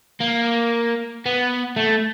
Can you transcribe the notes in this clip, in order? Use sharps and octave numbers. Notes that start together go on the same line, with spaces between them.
A#3
B3
A3